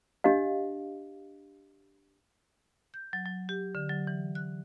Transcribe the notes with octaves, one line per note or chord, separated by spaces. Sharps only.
D4 G4 D#5 F5
G6
F#3
F#3
G4
D3
F#3
E3
F#6